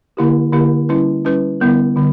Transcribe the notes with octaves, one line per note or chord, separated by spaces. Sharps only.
D3 A#3 E4 G4 A#4
D3 A#3 E4 G4 A#4
G3 C#4 E4 B4
G3 C#4 E4 B4
D3 G3 B3 E4 A#4
D3 G3 B3